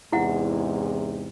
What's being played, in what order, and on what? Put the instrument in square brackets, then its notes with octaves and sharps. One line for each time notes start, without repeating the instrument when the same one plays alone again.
[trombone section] E2 G#2 C3 [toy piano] E4 F#5